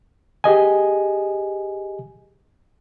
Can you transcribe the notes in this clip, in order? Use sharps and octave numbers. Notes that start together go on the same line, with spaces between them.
G4 G#4 D#5 G#5